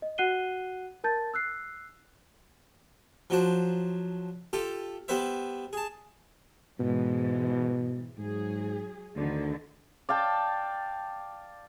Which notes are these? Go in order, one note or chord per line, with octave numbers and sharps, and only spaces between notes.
D#5
F#4 F#5 F#6 C7 D#7 G7
A#4 A5 G6 A6
E6 F#6 C7
F3 F#3 D4 C5
F4 G4 A4
G3 B3 B4 C5 E5
G#4 A5
G#2 B2 E3 G#3
G#2 F#3 G#4
D2 D3 D#3
D5 F5 G5 A5